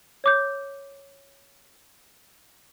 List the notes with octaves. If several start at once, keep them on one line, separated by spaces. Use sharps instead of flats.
C#5 D6 G6